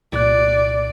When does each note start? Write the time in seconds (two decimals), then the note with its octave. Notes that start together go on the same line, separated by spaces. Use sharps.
0.12 C2 A#2 D5 F#6